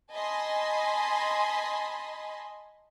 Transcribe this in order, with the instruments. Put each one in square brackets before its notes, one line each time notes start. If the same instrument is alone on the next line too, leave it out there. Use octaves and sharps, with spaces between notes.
[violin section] D#5 G#5 A5 B5 C6